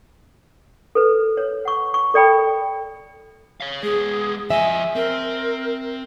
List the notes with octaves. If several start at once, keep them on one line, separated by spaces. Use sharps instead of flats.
A4 B4
C#5
F#5 C#6
C#6
A4 D5 G5 B5
C#5 F5
G#3 B3 G#4
F3 D#5 E5 G#5
C4 A#4